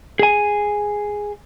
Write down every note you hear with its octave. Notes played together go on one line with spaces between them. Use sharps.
G#4 G#5